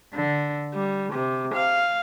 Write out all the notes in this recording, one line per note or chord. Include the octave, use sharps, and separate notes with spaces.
D3
G3
C3
F5